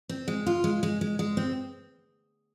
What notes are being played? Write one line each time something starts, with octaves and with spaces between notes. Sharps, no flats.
C4
G#3
F4
G#3
G#3
G#3
G#3
C4